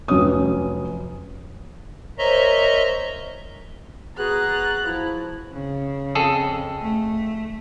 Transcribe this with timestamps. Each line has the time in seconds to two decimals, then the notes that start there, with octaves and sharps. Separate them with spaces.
0.08 F1 F#3 C#4 C#5 D#6
2.18 A#4 C5 C#5 D#5 E5 A#5
4.18 B3 F#4 G#4 A#5 F#6 A6
4.85 F3 E4
5.53 C#3
6.15 F2 G#4 A4
6.82 A3